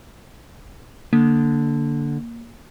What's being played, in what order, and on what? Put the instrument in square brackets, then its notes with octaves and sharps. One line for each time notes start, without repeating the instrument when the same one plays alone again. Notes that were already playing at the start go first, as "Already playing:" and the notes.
[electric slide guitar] D3 [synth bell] A#3